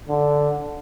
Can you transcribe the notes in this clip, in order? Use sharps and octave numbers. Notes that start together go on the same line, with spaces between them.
D3